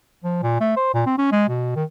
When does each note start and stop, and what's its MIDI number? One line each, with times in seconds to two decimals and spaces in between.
0.24 0.40 53
0.43 0.56 46
0.60 0.73 57
0.77 0.90 72
0.94 1.02 46
1.06 1.16 60
1.18 1.32 61
1.32 1.47 56
1.48 1.73 47
1.76 1.84 51